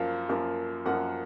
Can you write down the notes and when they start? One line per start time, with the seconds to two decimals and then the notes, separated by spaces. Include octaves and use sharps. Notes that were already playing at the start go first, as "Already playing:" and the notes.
Already playing: F#2 F3 A#3 F5
0.29 F#2 F3 A#3
0.86 F#2 F3 A#3 F#5